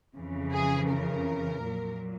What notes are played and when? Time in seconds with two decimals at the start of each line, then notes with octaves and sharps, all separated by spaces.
0.15 F2 C#3 E3
0.53 G#4
0.91 A#4
1.66 A#2 F#3